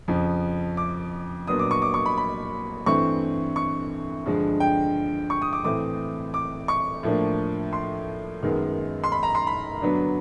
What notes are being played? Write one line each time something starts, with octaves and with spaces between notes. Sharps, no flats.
F2 C#3 F3
D6
A#2 F#3 B3 D4 D#6
D6
C#6
D6
C#6
B5
B5
G2 E3 A3 C4 C#6
C#6
G2 D3 F3 G#3
G5
C#6
D#6
D6
A2 E3 A3 C4 D6
D6
C#6
A2 F3 A#3 D4
C6
F#2 D#3 G#3 B3
C6
B5
A#5
C6
B5
G2 D3 F#3 B3 D4